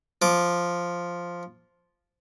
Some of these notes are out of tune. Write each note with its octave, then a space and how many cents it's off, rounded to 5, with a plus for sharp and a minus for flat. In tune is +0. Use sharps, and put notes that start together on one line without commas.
F3 +0 D6 +0